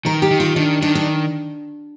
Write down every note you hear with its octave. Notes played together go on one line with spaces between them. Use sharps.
D#3 A#4
G4
D#3
F4
D#3 D4
D#3 D4
D4